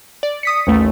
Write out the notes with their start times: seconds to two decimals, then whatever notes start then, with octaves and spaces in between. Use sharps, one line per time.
0.23 D5
0.43 D#6 B6 C#7
0.67 A1 D#2 A3